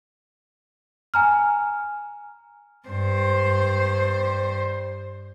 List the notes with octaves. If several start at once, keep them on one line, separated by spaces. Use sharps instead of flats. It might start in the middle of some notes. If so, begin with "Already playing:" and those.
G#5 A#5 F6
G2 C5